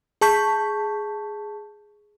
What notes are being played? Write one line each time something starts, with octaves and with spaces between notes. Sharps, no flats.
G#4 A5 C#6 G6 B6